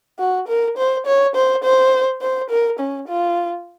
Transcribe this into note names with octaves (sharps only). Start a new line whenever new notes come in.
F#4
A#4
C5
C#5
C5
C5
C5
A#4
C#4
F4